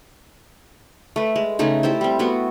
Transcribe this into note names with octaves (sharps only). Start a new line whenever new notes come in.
A3 B4
G#3
C#3 A3 D#4 G#4
E4 G4 A4 C5
G3 C4
A3 B3 F#4